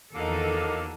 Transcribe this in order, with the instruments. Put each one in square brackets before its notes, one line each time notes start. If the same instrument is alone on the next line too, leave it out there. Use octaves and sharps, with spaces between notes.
[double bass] E2 [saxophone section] D3 F#3 A#3 [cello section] D#3 D#4 A4